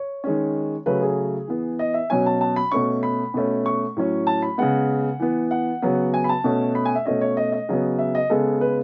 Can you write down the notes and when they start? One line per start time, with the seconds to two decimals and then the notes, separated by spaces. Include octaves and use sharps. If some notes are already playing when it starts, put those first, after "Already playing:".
Already playing: C#5
0.24 D#3 G#3 C#4
0.86 C#3 F#3 A3 B4
1.02 G#4
1.48 E3 B3
1.79 D#5
1.94 E5
2.10 B2 F#3 C#4 G#5
2.26 A5
2.41 A5
2.56 B5
2.72 B2 A3 C#4 C#6
3.03 B5
3.34 B2 A3 C#4
3.66 C#6
3.97 A2 F#3 C#4
4.27 A5
4.42 B5
4.58 C#3 G#3 B3 F#5
5.20 E3 B3
5.51 F#5
5.82 C#3 F#3 B3
6.14 G#5
6.24 B5
6.29 A5
6.44 B2 A3 C#4
6.75 B5
6.85 G#5
6.95 E5
7.06 B2 A3 C#4 D#5
7.21 C#5
7.37 D#5
7.52 D#5
7.69 C#3 F#3 B3
7.99 E5
8.15 D#5
8.30 C#3 G#3 B3 A4
8.61 B4